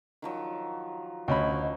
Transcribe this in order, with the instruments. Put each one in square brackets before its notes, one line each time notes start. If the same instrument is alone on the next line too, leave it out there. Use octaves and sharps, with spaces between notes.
[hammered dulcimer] D#3 F3 F#3
[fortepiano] D2 C#4 B5 [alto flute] D#5